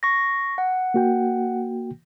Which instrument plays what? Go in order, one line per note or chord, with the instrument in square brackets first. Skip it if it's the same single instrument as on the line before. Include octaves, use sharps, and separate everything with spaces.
[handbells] C#6 A#6
F#5
[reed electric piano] A#3 F#4 G5